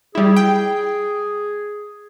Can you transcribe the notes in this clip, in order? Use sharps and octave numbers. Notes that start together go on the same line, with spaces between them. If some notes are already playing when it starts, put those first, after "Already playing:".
G3 E4 G#4
G5